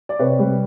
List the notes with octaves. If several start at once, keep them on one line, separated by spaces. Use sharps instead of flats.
D5
C3 B4 C#5
G3